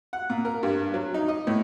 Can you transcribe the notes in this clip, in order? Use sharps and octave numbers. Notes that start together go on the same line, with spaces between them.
F#5
A#2
A#4
G2
F#3
D#4
D#5
A2